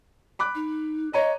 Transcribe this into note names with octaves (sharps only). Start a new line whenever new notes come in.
B5 D6 F#6
D#4
C#5 D#5 A#5 D#7